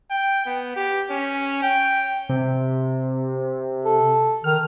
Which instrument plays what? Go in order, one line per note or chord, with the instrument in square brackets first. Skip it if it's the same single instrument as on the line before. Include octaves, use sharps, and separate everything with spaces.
[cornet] G5
B3
G4
C#4
G5
[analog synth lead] C3
[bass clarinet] A4
[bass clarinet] D#3 [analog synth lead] F6